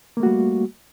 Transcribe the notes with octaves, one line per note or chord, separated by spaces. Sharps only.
G3 A3 A#3 F#4